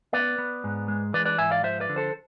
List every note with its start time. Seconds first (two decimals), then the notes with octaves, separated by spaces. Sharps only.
0.13 B3 B4 D5
0.38 B3
0.64 G#2
0.88 G#3
1.13 E3 B4 D5
1.25 B4 D5
1.38 G#2 E5 G#5
1.51 D5 F5
1.63 F3 C5 E5
1.80 B4 D5
1.89 D3
1.96 A4 C5